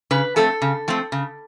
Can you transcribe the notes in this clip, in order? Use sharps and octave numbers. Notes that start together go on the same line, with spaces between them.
C#3 B4
F3 A3 C4 A4
C#3
F3 A3 C4
C#3